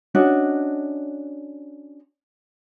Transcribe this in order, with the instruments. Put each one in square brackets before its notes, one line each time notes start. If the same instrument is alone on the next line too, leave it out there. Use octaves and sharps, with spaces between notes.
[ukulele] C#4 D4 F#4 D#5